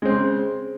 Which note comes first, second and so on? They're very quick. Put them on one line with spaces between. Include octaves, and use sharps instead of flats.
G#3 C4 C#3